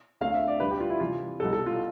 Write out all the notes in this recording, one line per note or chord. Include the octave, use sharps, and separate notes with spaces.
D2 D3 A3 C4 F5
E5
D5
D2 D3 G3 B4
G4
F4
E4
C3 E3 G3 F4
C2 B2 G3 A4
A4
F4